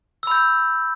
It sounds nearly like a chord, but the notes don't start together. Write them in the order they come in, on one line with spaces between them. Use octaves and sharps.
E6 B5 G6